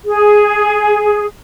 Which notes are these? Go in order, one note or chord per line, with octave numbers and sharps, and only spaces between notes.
G#4